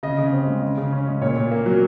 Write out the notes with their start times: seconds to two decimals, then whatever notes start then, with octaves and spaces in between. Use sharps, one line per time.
0.03 C#3 D#5
0.18 C#3
0.28 C4 D#5
0.47 G#3
0.62 C#3
0.78 C#3
0.92 C#4
1.07 G#3
1.21 A#2 C#5
1.37 A#2
1.51 A#3
1.66 F#3